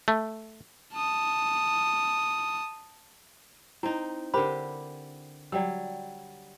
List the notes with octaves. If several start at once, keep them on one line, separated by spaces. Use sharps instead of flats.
A3
A5 D#6
C4 D#4 E4
D3 G4 A#4 C5 B5
F#3 G3 D5 G5 E6